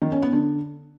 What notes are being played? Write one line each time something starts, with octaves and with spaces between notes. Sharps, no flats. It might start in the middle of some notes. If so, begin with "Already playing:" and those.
D#3
C#4
B3
D3